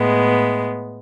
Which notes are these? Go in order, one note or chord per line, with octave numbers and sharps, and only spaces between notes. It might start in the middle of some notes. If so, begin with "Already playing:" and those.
Already playing: A2 G#3 B3